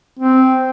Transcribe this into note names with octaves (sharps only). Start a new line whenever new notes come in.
C4